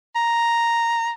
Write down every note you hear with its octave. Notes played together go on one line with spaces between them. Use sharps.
A#5